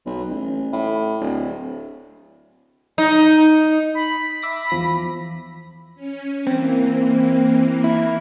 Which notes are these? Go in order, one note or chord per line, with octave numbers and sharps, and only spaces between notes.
B1
A1
A2
D1
D#4
B5
E5 D6 A#6
E2 F3 A#6
C#4
E3 A#3 C4
E4